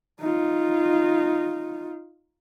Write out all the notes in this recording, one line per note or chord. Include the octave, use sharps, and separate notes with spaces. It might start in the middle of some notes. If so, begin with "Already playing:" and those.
D#4 F4